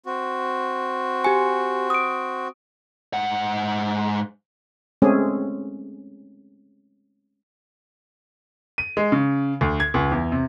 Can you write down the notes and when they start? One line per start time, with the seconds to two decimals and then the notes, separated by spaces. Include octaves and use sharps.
0.06 C4 F#4
1.24 G4 G#5
1.90 D#6 D7
3.14 G#2 F#5
5.02 G#3 A3 C4 C#4 G#4
8.78 D#7
8.97 G#3
9.12 C#3
9.61 D2
9.80 G#6
9.94 C#2
10.11 E2
10.32 C3